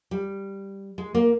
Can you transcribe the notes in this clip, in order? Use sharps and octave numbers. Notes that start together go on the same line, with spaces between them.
G3
G#3
A#3